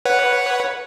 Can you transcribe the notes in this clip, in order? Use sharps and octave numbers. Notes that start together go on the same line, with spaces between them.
B4 C#5 F#5